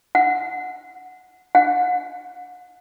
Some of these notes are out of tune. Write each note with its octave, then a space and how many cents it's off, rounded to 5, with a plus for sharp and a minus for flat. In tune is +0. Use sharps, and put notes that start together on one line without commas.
F#5 -5
F#5 -35